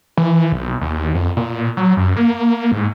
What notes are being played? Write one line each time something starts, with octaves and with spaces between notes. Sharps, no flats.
E3
B1
D#2
F2
A#2
F#3
F#2
A#3
G#2